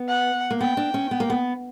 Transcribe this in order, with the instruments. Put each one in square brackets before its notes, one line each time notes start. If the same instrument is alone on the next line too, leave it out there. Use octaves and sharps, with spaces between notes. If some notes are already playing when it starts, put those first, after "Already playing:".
Already playing: [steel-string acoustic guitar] B3
[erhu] F#5
[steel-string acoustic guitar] A#3
[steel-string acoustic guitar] B3 [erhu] G5
[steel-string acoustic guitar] D4
C#4
B3
A#3
B3